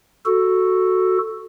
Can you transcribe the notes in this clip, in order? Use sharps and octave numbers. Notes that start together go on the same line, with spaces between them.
F#4 A4